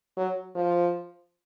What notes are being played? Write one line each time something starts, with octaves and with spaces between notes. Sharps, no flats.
F#3
F3